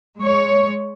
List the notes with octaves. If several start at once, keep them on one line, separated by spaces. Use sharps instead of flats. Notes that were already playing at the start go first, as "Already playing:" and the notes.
G#3 C#5